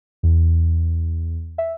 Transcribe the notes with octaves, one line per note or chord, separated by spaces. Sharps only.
E2
E5